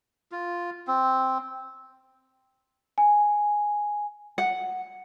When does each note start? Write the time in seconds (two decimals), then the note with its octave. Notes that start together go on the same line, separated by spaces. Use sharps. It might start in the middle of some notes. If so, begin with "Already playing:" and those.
0.32 F4
0.87 C4
2.98 G#5
4.38 F#5